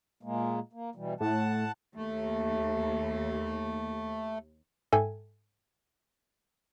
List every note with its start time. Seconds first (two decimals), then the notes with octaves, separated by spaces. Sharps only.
0.23 A#2 G#3 A#3
0.73 A#3
0.95 B2 E3 G3
1.20 A2 F#5 A5
1.95 D#2 A3
4.92 G#2 A4 E5 G5 G#5